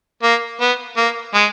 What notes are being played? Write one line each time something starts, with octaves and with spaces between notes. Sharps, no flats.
A#3
B3
A#3
G#3